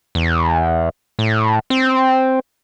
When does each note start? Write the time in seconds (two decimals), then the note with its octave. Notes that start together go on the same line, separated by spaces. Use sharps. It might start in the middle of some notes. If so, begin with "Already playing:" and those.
0.15 E2
1.19 A2
1.70 C4